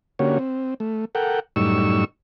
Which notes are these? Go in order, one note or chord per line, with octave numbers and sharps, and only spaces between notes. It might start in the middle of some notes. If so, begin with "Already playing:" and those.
D3 A#3 C#4 F#4 G4 C#5
C4
A3
A4 A#4 F#5 G5
F#2 A2 G3 D#4 C#6 E6